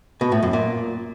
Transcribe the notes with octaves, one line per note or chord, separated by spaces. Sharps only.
B2
A2
F#2
A#2